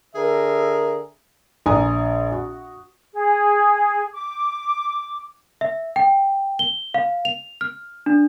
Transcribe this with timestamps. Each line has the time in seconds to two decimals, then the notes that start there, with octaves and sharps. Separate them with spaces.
0.15 D3 G#4 A#4 E5
1.66 A#1 G#5 A#5 D#6
2.32 F#4
3.12 G#4
4.12 D6
5.61 E5
5.96 G5
6.59 G7
6.94 F5
7.25 F7
7.61 F6
8.06 D4